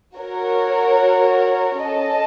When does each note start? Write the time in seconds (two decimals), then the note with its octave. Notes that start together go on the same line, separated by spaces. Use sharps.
0.15 F#4 A#4 C#5
1.82 C#4 A4 D#5 A5